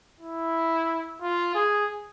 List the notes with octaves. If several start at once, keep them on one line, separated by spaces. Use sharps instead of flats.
E4
F4
G#4